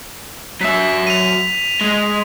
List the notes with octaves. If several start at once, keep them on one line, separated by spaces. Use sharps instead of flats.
F#3 E5 B6
D#7 F7
G#3